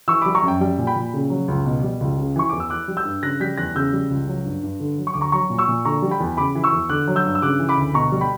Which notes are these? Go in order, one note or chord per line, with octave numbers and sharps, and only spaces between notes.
E3 C#6 E6
G3 B5 D6
A#5 C#6
F#2
G5
G3 G5
A#2
G5 B5
A#2
C#3
F#3
C#2
B2
G3
C#2
C#3
E3 C#6
E2 D6
E6
E3 D6 F#6
G3
E6 G6
G2
C#3 F#6 A#6
G3 G6 B6
E2 F#6 A#6
C#3 E6 G6
G3
C#2
F#3
G2
G2
D3
F#3
C#6
D2 D6
A#5 C#6
F#3 A#5 C#6
A#2
C#6 E6
A#2
D3 A#5 C#6
G3
G5 B5
E2
C#3 B5 D6
E3
C#6 E6
E2
D3 D6 F#6
F#3
E6 G6
G2
E6
C#3 D6 F#6
E3
B5 D6
D2
B2 A#5 C#6
G3
G5 B5